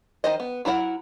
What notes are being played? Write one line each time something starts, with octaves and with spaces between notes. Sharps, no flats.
D#3 C5 D#5
B3
F#3 E4 A#4 F#5